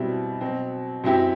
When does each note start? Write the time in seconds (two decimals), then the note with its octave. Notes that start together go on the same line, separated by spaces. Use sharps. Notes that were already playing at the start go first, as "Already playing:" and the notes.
Already playing: B2 G3 C4 E4
0.41 B2 F#3 C4
1.04 F#2 F#3 C4 E4 G4